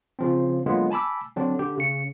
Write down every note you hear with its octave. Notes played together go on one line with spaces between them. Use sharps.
C#3 F3 C4
D3 F#3 G#3 A#3 B3 F4
G#5 A5 B5 D6 E6
D3 F#3 C4 D4
D3 G4
C#3 C#7